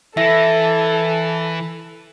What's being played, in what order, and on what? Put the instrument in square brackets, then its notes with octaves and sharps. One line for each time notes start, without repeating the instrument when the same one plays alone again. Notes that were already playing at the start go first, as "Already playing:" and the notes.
[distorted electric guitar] E3 [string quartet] A4 [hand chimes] E5 A#6